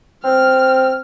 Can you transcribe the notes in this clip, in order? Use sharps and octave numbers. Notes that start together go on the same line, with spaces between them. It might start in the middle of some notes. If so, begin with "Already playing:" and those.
C4 F6